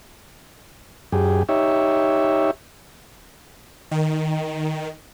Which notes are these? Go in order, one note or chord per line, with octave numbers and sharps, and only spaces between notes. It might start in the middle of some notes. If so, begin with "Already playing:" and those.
F#2 G4 G#4
D#4 G4 C#5 E5
D#3